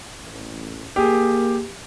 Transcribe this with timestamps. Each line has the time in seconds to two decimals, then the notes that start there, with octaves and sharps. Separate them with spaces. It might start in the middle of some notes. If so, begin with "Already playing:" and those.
0.21 A1
0.96 A#3 G4 G#4